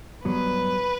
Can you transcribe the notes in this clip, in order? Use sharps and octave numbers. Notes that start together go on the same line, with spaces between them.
G2 F#3 B3 B4